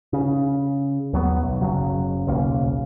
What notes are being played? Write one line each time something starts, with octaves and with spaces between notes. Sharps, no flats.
C#3
D#2 F#3 B3
B1
F#1 C#3 F#3
D#1 B1 C#3 A#3